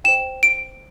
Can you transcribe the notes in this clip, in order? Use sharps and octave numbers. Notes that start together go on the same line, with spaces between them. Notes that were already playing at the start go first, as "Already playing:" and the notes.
C5 G5 E7
D7